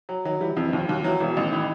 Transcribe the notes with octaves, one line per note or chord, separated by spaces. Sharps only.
F#3
D#3 F#3
E3 G3
F2 E3
D#2 F3
D#2 F#3
E3 F#3
E1 E3
A1 D#3
D#3 E3